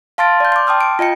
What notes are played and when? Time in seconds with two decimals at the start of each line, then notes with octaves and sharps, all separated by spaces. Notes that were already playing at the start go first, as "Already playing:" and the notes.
0.18 F5 A5 C6 F6 A6 D7
0.40 D5 G6
0.52 C6 D6
0.67 G5 A5 D#6 F6
0.81 D7
0.99 F4 D#5 G5 C#7